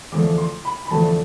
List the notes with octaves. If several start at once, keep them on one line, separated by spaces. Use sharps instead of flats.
E2 D3 F3 A3 D6
C6
B5
B5
E2 D3 F3 A3 A5